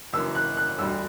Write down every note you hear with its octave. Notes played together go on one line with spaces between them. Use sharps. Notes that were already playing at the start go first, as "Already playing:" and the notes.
F#1 F#2 E3 E6
F#6
F#6
E1 D2 D3 G3 E6